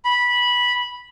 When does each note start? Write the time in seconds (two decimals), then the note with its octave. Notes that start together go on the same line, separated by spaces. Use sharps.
0.05 B5